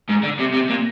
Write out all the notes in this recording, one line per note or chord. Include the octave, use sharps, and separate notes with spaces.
G#2
D3
C3
C3
A#2